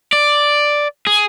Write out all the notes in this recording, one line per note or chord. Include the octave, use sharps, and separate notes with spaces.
D5
G#4